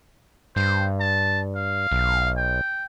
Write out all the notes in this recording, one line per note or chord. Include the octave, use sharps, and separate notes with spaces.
G2 C5
A5
F5
B1
G5